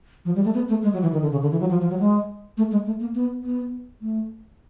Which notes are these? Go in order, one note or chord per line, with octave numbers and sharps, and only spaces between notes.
F3
G3
A3
B3
A3
G#3
F#3
E3
D#3
D3
C#3
D3
E3
F#3
F3
F3
F#3
G#3
A3
G#3
A3
A#3
B3
B3
A3